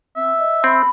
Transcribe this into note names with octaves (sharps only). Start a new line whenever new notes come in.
C4 E5
D#5
C4 B5